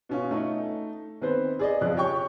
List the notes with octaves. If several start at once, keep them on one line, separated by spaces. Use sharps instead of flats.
B2 C#4 F4
A3 D#4
D#3 B3 C4 B4 C5
G#4 D5 D#5
F2 C#3 F3 F#6
G4 C#5 G5 C#6